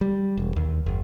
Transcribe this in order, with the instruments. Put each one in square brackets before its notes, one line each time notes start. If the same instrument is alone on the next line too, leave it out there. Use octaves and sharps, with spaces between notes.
[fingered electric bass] G3
E1
D#2
F#1